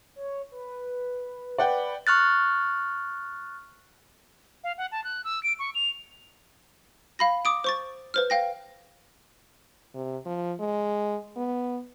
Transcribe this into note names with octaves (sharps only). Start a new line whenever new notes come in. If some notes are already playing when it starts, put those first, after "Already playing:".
C#5
B4
B4 D5 F#5 G5
C#6 F6 F#6 A6
F5
F#5
A5
F#6
E6
D7
C#6
F7
F5 B5 A#6
D6 D#6 D7
C5 C#6 A6
B4 C5 F6
F5 G5 A#6
C3
F3
G#3
B3